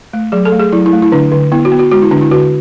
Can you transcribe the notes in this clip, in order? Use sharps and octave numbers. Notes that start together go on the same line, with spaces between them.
A3
F#3 G#4
A4
A3
G#4
F#3 E4
E4
A3
E4
D3 D4
D3
B3 E4
F#4
B3
F#4
G#3 F#4
E4
D3 D4
E4
D3 F#4